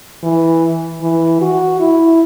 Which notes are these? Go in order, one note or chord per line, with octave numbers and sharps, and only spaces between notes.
E3
E3
F#4
E4